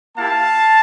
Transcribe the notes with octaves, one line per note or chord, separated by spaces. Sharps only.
A#3 E4 G4 F5 A5